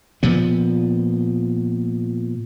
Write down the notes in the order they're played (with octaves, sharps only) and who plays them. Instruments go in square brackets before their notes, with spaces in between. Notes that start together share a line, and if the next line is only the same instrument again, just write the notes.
[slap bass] A#2 F3 B3